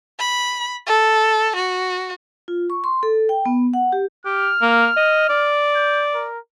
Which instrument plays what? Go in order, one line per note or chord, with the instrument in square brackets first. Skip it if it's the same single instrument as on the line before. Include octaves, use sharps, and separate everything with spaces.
[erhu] B5
A4
F#4
[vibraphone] F4
C#6
C6
A4
G5
B3
F#5
G4
[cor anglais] G4 [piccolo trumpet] F6
[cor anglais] A#3
D#5
D5
[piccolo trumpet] G6
A#4